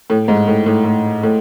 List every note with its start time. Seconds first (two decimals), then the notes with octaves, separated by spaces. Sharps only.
0.10 A2
0.28 G#2
0.48 A2
0.66 A2
0.84 A2
1.23 A2